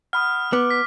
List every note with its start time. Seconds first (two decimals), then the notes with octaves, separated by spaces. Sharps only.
0.13 F#5 B5 D#6 F6
0.53 B3 D6
0.70 B6